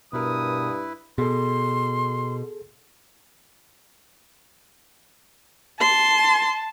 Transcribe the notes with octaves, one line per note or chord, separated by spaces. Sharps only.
G2 B2 E4 A#4 B4 D#6
B2 G#4 A4 C6
A5 C6